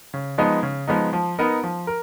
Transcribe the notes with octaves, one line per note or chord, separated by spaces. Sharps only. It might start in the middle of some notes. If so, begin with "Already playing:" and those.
C#3
F3 G#3 B3 D#4
C#3
F3 G#3 B3 D#4
F3
B3 D#4 A#4
F3
A#4